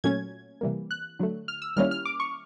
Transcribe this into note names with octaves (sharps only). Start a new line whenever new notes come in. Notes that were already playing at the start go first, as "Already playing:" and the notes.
A#2 F#3 A3 C#4 G#6
C3 E3 G3 A#3
F#6
D3 F#3 A3
F6
E6
D#3 G3 A#3 C#4 E4 F6
F6
D6
C#6